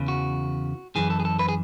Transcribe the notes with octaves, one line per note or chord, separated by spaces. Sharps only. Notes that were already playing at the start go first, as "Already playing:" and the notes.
Already playing: E2 C#3 E3
F#4
F#2 E3 G#4
A4
G#4
A4
B4
G#4